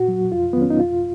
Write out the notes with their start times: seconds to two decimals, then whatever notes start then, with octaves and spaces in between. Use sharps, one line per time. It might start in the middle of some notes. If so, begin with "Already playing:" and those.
Already playing: A#2 F#4
0.08 F#3
0.32 F2 F4
0.53 D#3 F#3 B3
0.62 C#4
0.70 D#4
0.79 F2 F4